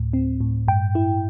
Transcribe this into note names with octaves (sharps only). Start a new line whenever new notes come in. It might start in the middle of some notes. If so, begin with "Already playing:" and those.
Already playing: D2 A2
C4
A2
G2 G5
E4